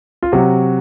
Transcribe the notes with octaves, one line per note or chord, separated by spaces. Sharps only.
F4
C3 F#3 F#4